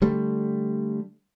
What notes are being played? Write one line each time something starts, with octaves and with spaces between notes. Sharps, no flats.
D3 G3 A3